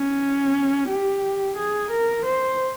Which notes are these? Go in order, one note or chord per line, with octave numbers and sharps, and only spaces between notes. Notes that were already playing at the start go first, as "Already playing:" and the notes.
Already playing: C#4
G4
G#4
A#4
C5